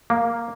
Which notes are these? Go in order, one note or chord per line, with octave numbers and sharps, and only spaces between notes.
A#3